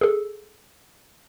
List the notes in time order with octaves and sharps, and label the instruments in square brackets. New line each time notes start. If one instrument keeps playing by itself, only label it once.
[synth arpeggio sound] G#4 A4